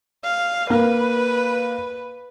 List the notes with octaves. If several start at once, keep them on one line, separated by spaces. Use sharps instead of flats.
F5
A#3 B4